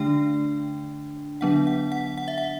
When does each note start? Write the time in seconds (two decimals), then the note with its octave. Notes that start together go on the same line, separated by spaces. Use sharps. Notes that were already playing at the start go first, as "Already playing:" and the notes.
Already playing: D3 A3 D4 G5
1.41 D3 F#3 B3 D4 F#5
1.67 F#5
1.92 F#5
2.18 F#5
2.28 E5
2.38 F#5